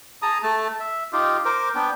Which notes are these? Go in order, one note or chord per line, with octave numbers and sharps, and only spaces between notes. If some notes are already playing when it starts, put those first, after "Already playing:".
G#4 A5 A#5 D#6
A3 A5
E5
D#4 F4 G4
A#4 C5 D6
B3 D4 G5